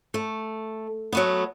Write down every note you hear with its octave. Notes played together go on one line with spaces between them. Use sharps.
A3
F#3 A3 B3